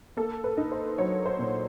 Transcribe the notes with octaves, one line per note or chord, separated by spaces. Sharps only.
A#3 A4
B4
D#4
C5
F#3 C#5
C5
A#2